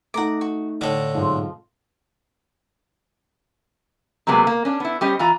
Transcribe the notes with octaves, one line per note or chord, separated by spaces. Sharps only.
A3 D#4 F#5 A#5 D6
F#4
A2 D3 A4 D#5
B1 G#2 F3 C4
C3 F#3 G#3 A#3 B3
A#3
C#4 D4
B3 E4
G3 C#4 G4 C5 D#5
E3 F4 A#5